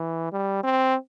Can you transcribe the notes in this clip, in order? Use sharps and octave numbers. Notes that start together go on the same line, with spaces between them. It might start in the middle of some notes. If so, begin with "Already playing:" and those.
Already playing: E3
G3
C4